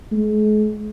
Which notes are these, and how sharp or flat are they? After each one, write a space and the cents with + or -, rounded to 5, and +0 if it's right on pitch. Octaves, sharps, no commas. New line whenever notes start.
G#3 +40